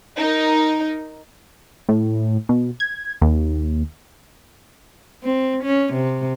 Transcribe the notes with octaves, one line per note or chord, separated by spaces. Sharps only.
D#4 A#4
A2
B2
G#6
D#2
C4
C#4
C3